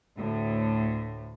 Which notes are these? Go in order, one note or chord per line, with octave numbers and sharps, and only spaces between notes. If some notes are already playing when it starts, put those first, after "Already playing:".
D2 A2